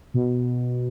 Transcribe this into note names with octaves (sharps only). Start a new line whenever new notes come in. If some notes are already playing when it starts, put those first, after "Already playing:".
B2